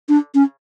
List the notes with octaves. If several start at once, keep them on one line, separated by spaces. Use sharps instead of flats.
D4
C#4